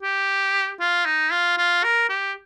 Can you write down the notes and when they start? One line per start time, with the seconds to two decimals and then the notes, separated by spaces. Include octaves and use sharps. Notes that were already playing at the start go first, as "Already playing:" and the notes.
0.03 G4
0.80 F4
1.06 D#4
1.32 F4
1.58 F4
1.84 A#4
2.09 G4